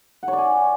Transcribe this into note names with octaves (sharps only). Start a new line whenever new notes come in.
F#5
C#5
D5
G#5